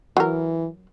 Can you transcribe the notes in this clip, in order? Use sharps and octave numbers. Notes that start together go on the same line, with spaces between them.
E3 F#3 A#4